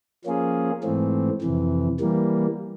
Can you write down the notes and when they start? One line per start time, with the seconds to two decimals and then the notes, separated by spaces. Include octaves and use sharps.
0.25 F3 A#3 C#4 F4 G#4
0.83 G#2 E3 A3 C4
1.42 F2 C3 E3
2.00 E3 G3 A#3